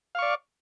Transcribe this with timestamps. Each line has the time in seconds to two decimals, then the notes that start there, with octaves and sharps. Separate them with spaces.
0.15 F5
0.19 C#6
0.22 D5